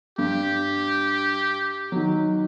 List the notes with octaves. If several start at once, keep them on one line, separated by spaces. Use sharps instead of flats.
G2 G4
D#3 F#3